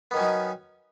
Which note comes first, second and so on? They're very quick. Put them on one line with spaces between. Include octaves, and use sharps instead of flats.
B3 D#3 C#4 F#3 D#4